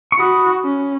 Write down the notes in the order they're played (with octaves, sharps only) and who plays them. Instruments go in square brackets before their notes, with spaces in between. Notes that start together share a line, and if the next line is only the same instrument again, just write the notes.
[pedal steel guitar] C#6
[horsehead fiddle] F#4 [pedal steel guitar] B5 D#6
[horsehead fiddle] C#4